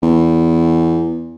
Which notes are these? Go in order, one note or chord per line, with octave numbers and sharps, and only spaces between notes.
E2